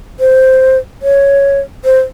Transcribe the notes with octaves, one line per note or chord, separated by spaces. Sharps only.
C5
C#5
C5